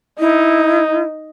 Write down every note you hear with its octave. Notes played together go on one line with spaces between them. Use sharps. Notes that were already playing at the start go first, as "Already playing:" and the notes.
D#4 E4